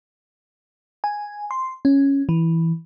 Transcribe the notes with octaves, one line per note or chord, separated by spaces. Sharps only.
G#5
C6
C#4
E3